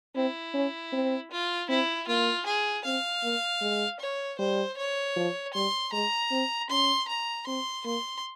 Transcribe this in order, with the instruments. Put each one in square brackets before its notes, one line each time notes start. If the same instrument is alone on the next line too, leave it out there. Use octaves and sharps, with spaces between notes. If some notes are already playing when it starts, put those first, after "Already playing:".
[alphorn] C4 [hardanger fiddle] E4
[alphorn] C#4
C4
[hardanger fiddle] F4
[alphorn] C4 [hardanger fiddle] E4
[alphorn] A#3 [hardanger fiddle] F4
[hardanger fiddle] G#4
[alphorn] C4 [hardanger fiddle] F5
[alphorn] A#3
G#3
[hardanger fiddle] C#5
[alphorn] G3 [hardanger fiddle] C5
[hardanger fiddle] C#5
[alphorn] F3
[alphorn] G3 [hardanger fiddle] C6
[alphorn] G#3 [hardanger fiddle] A#5
[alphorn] C4
[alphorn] C#4 [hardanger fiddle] C6
[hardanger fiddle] A#5
[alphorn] C4 [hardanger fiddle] C6
[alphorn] A#3 [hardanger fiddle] C6